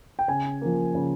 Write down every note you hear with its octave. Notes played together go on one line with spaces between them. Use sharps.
G5
C#3 G#5
F3 A#3
C#3